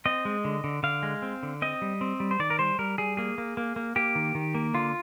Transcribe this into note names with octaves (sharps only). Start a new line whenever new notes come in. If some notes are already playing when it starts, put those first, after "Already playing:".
C4 D#5
G#3
D3
D3
D3 F5
G#3
C4
D3
C4 D#5
G3
C4
G3
C5
D#3 D5
A#4
G3 C5
G3 A#4
G3 G#4
A#3 G#4
A#3
A#3
A#3
A#3 G4
D#3
D#3
A#3
D3 F4